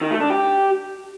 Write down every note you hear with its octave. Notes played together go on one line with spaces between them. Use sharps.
D#3
A3
D4
G4